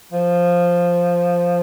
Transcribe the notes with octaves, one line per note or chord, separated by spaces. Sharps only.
F3